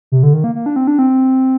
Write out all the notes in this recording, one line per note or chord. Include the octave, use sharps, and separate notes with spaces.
C3
D3
D#3
A#3
A#3
D4
C4
D4
C4